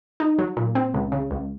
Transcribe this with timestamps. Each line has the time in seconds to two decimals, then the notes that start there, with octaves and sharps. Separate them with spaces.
0.20 D#4
0.38 F#3
0.57 A#2
0.75 C4
0.94 C#2
1.12 C#3
1.31 C#2